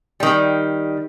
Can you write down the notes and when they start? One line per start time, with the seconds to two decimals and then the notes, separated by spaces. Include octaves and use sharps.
0.20 D#3 G3